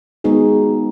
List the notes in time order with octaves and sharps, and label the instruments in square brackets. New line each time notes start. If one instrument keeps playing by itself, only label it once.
[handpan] G#3 B3 D#4 F#4 G#4